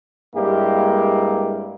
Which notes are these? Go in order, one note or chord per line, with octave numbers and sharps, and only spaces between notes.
G2 G#3 A#3 E4 G4